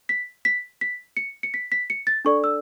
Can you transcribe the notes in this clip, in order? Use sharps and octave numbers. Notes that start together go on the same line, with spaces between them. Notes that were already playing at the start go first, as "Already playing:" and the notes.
B6
B6
B6
C#7
C#7
B6
B6
C#7
A6
D4 A4 D5 C#6
E6